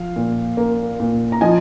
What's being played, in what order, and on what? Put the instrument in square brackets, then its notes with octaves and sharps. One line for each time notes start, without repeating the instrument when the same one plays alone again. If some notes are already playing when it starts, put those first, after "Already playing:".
Already playing: [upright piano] F3 F5
A#2
A#3
A#2
A#5
F3 D#5 G#5